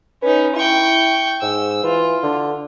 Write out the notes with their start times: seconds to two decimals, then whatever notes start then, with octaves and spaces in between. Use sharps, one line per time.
0.22 C#4 D#4 B4
0.56 E4 G5 C#6
1.42 G#2 E6
1.83 E3 F4
2.23 D3